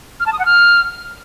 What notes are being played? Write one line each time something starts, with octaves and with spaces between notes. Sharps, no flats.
F6
A5
D#6
F#5
F6